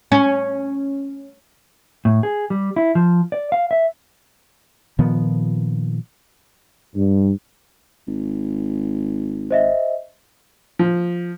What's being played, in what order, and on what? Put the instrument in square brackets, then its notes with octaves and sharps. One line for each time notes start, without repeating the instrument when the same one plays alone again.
[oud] C#4
[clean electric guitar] A2
G#4
G3
E4
F3
D5
F5
E5
[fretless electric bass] A#2 D#3 F3 B3
[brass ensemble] G2
[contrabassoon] G#1
[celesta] C5 D#5 E5
[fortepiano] F3